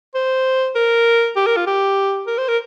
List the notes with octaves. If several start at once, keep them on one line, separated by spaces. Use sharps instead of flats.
C5
A#4
G4
A#4
F4
G4
A#4
C5
A#4